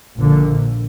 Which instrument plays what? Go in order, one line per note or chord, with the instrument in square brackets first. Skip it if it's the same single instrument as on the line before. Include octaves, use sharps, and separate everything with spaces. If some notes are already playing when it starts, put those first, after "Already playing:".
[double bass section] A#1 A#2 D3